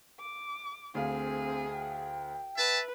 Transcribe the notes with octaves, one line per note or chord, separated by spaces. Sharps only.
D6
D2 C4 G#4 F5
G5
B4 E5 A5